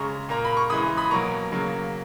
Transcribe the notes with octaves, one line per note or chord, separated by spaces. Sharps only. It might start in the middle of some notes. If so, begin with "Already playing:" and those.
Already playing: C#3 G#3 A#5 C#6
A#2 A#3 A#5
B5
C#6
C#3 E3 G#3 B5 D#6
B5 D#6
B2 F#3 A#3 A#5 C#6
C#3 F#3 A#3